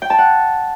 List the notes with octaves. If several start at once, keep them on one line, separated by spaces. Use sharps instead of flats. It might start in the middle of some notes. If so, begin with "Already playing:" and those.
G5
A5
F#5